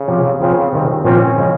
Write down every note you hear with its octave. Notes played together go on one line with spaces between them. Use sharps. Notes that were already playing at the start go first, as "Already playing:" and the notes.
Already playing: C#3
C3 F3 C4
C#3 F3 C4 F4
C3 D#3 G3 C4
A#2 F3 C4 C#4 F4
C#3 F3 G#3